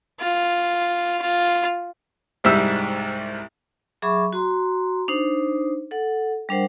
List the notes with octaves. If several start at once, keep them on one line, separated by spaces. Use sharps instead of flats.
F4
F4
C2 G#2 G3 E5 E6
F#3 G#4 E5 B5 C#6 D6
F#4 A#5 C6
D4 D#4 C5
A4 F#5
G3 D4 A#4 C5 F#5